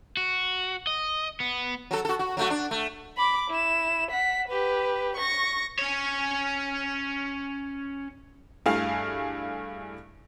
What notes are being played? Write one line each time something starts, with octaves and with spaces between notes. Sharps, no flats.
F#4
D#5
B3
F#3 A4
F#4 A4
F#4
F#3 A3 F#4
D4
A3
B5 D6
E4 E7
F#5 B6
G4 B4
C#6 A#6
C#4 C#5
G2 A3 E4 G#4 F5